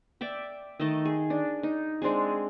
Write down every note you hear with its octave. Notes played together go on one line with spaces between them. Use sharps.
D5 E5 G5
D#3 A3 D#5 A5
G#4
D4
D#4
G#3 C4 D4 G#4